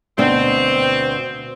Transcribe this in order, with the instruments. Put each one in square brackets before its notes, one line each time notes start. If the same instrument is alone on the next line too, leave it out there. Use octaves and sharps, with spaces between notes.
[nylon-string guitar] D2 B2 D4 [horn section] C4